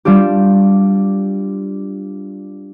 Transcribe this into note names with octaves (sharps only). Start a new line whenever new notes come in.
G3 D4 F4 G4